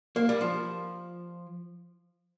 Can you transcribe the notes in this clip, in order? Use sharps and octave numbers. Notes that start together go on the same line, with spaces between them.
A#3
G3
F3